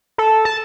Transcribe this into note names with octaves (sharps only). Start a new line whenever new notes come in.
A4
A5